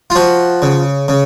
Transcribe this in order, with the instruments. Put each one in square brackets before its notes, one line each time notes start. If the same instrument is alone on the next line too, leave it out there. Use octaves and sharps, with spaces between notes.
[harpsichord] F4
F3 F#4
C#3
C#3